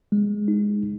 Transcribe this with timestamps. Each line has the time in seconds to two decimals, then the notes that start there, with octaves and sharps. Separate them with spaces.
0.12 G#3
0.48 D#4